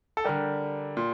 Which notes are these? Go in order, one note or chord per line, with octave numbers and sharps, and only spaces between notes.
A4
D3 G3 G4 A#4
A#2